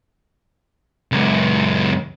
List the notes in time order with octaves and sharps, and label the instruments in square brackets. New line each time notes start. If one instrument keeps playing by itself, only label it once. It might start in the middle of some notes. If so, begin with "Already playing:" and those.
[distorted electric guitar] C#2 F#2